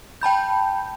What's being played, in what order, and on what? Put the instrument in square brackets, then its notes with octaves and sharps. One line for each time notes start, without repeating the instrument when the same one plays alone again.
[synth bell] G5 A5 B5 G6